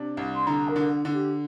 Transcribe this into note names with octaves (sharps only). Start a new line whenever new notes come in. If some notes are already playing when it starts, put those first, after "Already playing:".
Already playing: C3 D4
C2
C6
D3 A#5
A#4
D3
D3
G4